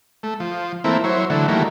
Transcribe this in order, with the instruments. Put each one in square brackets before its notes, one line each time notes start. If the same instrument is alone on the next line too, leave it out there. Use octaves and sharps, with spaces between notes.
[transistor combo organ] A3
F3
E3 A3 A#3 C4 E4
F#3 E4 C5 C#5
D3 E3 F#3 A3
D#3 E3 F#3 G3 A3 A#3